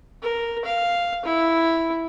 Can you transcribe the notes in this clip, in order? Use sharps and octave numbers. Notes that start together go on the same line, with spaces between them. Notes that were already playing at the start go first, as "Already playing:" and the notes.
A#4
F5
E4